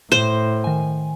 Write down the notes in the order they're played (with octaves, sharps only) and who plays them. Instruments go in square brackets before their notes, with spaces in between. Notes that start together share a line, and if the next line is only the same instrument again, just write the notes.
[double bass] A2 [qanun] C5
[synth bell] D#3 G#5